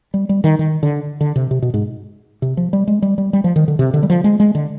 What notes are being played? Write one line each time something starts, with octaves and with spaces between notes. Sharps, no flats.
G3
G3
D#3
D#3
D3
D3
C3
C3
B2
G#2
C3
F3
G3
G#3
G3
G3
G3
F3
D#3
D3
C3
D3
G3
F3
G#3
G#3
D3